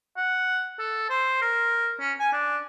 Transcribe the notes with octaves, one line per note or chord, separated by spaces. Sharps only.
F#5
A4
C5
A#4
C#4
G#5
D4